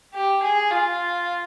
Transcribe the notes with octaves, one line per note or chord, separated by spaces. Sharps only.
G4
G#4
F4